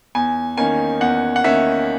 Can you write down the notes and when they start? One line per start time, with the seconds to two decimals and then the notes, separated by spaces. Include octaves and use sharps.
0.15 E2 G#5
0.57 D#3 A#3 C#4 G#5
1.01 E2 F#5
1.36 F#5
1.44 D#3 A#3 C#4 E5